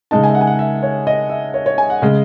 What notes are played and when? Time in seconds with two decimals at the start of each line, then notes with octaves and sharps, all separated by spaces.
0.11 C#3 G#3 D#4 A5
0.24 G#5
0.29 E5
0.35 F#5
0.41 G#5
0.47 F#5
0.59 E5
0.83 C#5
1.07 D#5
1.29 E5
1.54 C#5
1.66 C#5
1.78 G#5
1.90 F#5
2.02 C#3 G#3